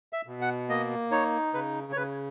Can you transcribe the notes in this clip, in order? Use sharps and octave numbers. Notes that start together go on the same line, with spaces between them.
E5
B2
F#5
A#3 D#5
D#4 C#5
C#3 B4
C#5
C#3 B4